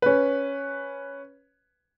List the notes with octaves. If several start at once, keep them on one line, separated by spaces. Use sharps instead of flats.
C#4 B4